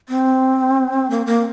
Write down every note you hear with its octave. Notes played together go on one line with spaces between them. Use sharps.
C4
A#3
A#3